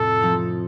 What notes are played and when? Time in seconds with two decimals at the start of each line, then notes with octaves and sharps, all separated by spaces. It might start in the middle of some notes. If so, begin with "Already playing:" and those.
Already playing: F2 A2 C3 A4
0.22 F3 C4 D#4